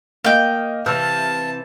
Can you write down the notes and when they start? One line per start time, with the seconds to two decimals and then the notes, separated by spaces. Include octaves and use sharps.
0.24 A#3 D#5 F5 G5
0.86 C3 E3 A5 E6 F6 G6